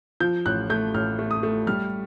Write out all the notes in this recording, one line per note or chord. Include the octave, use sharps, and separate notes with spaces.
F3 G6
A1 F#6
A3 G6
A1 F6
A3
D#6
A3
G3 F6